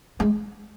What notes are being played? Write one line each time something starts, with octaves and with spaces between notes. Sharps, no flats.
G#3